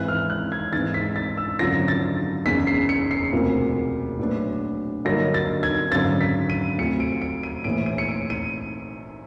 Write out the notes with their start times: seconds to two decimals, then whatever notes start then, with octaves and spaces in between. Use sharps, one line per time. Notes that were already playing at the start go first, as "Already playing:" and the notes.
Already playing: G#1 G#2 E3 F#6
0.08 F6
0.30 F#6
0.52 G#6
0.73 G#1 G#2 E3 A6
0.94 B6
1.16 A6
1.37 E6
1.59 G#1 F#2 D3 F3 A#6
1.88 A6
2.45 F#1 E2 C#3 B6
2.67 C7
2.89 C#7
3.11 C7
3.32 E1 D2 C3 F3 A#3
4.19 A#1 A2 F#3 B3 D4
5.05 G2 D3 F#3 A#3 D#4 A#6
5.34 A6
5.63 G#6
5.92 G#1 F#2 D3 A6
6.21 B6
6.50 D#7
6.78 D2 C3 F3 C#7
7.00 D7
7.21 D7
7.43 D#7
7.64 A#1 A2 E3 D7
7.86 D#7
7.98 C#7
8.09 D7
8.30 D#7